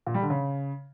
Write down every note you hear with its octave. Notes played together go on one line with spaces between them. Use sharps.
A#2
G3
D3
C#3